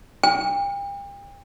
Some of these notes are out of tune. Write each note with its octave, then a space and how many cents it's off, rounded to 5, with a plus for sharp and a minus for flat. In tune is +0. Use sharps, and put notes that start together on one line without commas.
G5 +40